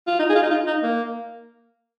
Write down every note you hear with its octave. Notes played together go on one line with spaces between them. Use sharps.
F4
D#4
G#4
F4
D#4
F4
D#4
A#3